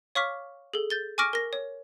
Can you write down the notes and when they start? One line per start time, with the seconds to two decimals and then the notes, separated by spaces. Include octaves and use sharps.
0.15 C#5 F5 C#6 D6 F6 B6
0.74 G#4 A4
0.90 G6 A6 G7
1.18 G#5 C#6 D6 F6 A#6 D7
1.33 A#4 A#6
1.53 C#5